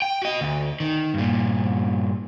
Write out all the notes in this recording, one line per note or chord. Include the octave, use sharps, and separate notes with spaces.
G5
F#4 D#5
D2
D#3
G2 A#2